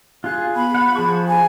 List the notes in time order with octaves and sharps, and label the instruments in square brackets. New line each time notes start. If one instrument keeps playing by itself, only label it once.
[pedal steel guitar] F4 G#4 [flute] F#6
[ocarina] B3 [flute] B5
[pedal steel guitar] F#5
[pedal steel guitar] F3 A5 C#6 [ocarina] G#4
[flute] G#5